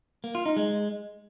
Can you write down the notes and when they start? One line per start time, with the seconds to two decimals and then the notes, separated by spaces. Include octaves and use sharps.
0.24 A#3
0.35 F4
0.46 D#4
0.57 G#3